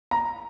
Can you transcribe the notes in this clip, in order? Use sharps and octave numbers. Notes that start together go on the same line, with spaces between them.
A#5